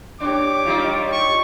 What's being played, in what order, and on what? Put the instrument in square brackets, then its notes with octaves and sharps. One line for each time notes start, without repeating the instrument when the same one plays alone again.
[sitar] D4 [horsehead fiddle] G4 C#5 [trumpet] D6
[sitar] G3 D#4 F4
[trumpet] C#6